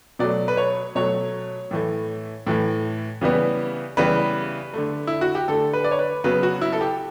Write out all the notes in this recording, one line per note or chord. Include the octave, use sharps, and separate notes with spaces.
B2 F#3 A3 D5
B4
C#5
B2 F#3 A3 C#5
A2 E3 A3
A2 E3 A3
C#3 E3 G3 B3
C#3 E3 G3 B3 B4
D3 A3
E4
F#4
G4
D3 A3 A4
B4
D5
C#5
B4
C#3 F#3 B3 B4
F#4
E4
A4
G4